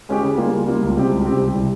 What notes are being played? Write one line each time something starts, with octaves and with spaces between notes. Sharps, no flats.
G#3 C#4 G4
C#3
G3 A#3 F4
C#3
G3 A#3 F4
C#2
C3 G3 C4 G4
C#2
C3 G3 C4 G4
C2
C3 G3